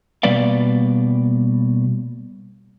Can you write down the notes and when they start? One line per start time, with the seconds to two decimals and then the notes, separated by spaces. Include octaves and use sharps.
0.23 B2 G3 A#3 B4 D5 F5